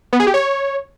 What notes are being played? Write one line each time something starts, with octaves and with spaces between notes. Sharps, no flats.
B3
G#4
G4
C#5